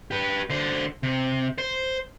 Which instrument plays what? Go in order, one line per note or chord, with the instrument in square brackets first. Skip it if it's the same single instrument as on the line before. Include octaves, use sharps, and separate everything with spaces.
[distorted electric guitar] G4 B4
D3 C5
C3
C5